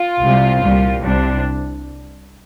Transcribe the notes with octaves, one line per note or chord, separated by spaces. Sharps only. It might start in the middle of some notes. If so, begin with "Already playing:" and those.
Already playing: F4
C2 C3 G3
C2 A#2 G3
C2 C3 G3 D4